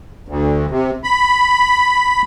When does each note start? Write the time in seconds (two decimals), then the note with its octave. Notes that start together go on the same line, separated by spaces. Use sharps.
0.28 D2
0.71 C3
1.04 B5